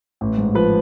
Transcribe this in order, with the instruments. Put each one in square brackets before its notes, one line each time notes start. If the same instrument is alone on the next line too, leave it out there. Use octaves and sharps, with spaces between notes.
[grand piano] A1
G#2
F3 B4